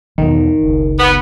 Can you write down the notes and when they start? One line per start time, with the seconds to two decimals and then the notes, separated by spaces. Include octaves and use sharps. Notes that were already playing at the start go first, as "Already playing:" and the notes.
0.18 B1 E2 B2 D#3
0.61 F#1 C#2
0.99 B3